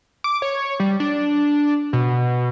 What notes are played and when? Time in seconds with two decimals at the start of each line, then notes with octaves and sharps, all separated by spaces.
0.24 D6
0.42 C#5
0.80 G3
1.00 D4
1.93 B2